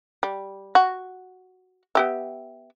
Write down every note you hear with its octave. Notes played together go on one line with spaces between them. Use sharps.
G3
F#4
B3 G4 E5